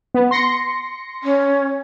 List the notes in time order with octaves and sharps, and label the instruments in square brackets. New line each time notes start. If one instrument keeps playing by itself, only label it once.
[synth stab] B3
C6 A#6 C#7
[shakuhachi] C#4